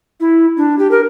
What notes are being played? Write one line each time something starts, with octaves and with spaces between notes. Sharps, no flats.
E4
D4
G4
A#4